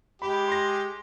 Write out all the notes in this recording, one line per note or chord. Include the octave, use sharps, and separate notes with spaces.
G#3 G4 B5
C6 A#6